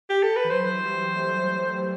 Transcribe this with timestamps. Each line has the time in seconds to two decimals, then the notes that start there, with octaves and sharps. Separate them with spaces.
0.10 G4
0.23 A4
0.36 B4
0.45 E3
0.50 F#3 C5
0.64 E3
0.73 F#3
0.84 G3
1.16 A3
1.49 G3